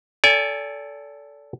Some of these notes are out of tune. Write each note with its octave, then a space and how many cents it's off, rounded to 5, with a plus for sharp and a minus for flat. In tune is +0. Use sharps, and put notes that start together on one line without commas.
A4 +0 D5 -35 G#5 -25